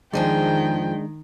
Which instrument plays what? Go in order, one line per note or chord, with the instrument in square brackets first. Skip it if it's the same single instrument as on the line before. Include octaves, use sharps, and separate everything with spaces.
[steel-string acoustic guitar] F2 F3 G#4 [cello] D#3 [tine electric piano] G#3 D4 [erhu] G5